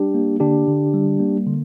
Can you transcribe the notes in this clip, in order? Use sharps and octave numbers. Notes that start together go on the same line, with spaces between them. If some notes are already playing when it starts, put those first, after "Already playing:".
Already playing: G3 D4 G4
A#3
D3 D4 G4
D3
G3
A#3
D3